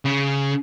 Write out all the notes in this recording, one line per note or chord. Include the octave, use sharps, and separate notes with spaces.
C#3